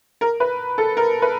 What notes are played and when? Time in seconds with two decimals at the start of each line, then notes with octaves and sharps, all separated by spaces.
0.21 A#4
0.40 B4
0.78 A4
0.97 A#4
1.22 B4